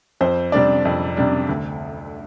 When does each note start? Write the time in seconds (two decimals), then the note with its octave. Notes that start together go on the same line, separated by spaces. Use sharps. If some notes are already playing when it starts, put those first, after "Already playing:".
0.21 F2 C5
0.52 C3 G3 D4 D5
0.85 F2
1.17 C3 G3 D4
1.49 D2